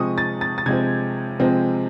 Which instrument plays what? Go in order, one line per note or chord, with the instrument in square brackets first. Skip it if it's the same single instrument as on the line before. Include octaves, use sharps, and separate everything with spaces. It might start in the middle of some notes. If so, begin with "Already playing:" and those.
Already playing: [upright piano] C3 F3 G#3 C4 C#6 D#6
A6
A6
A6
C3 F3 G#3 C4 G#6
C3 F3 G#3 C4